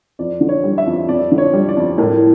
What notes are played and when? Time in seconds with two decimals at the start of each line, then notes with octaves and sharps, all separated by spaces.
0.19 F2 D5
0.41 D3
0.49 C#5
0.64 G3
0.78 E5
0.86 F2
1.08 F2 D5
1.32 D3
1.38 C#5
1.53 G3
1.69 D5
1.77 F2
1.98 A2 A#4